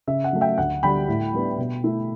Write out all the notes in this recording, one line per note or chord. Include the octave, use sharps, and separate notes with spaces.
C#3 E5
F#5
F#3 A3
E5 G5
D2 F#5
D3 G3 G5 B5
A2
G3 B3 D4
B2
A3 E4